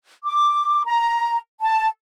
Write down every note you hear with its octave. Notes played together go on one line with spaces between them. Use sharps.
D6
A#5
A5